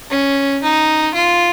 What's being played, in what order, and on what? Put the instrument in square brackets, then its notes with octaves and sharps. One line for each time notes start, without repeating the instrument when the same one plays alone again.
[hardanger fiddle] C#4
D#4
F4